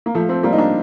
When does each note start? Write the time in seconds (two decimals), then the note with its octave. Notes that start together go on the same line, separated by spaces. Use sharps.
0.06 A#3
0.15 F3 A3
0.29 A3 C4
0.43 G3 A#3
0.53 D#4
0.58 A#3 D4